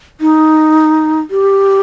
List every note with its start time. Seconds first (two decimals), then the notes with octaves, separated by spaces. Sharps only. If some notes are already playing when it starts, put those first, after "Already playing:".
0.21 D#4
1.31 G4